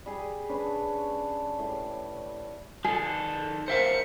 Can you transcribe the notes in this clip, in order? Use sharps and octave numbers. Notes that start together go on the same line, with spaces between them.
G3 G#4
C#4 D4 B4 C#5
A2 G3
D#3 G#4 A4
A#4 C5 E5 F5 C#7